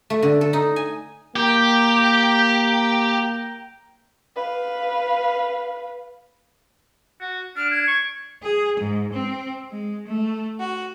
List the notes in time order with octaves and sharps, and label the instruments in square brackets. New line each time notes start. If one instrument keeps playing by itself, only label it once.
[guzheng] A3
D3
A4
D#4
G#5
[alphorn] A#3 [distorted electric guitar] G4 [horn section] G5 A#5
[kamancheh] B4 F5
[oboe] F#4
[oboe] D4 [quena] F6
[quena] G#6
[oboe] C#6
[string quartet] G#4
G#2
C4
G#3
A3
F#4